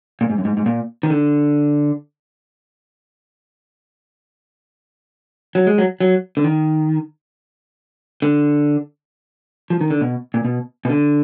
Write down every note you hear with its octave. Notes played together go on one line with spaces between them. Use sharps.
A#2
G#2
F#2
G#2
G#2
A#2
D#3
D3
F#3
G#3
F#3
F#3
D3
D#3
D3
F3
D#3
D3
B2
A#2
B2
B2
D3